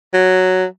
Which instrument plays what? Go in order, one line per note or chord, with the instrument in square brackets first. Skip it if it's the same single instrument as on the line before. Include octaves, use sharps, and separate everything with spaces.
[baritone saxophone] F#3